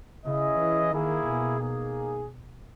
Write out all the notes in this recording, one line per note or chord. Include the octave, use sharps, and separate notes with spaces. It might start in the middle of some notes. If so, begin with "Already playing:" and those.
C#3 C#4 E4 G#4 D#5
E3
D#3 A#3 E4 G#4
B2
A#3 D#4 G#4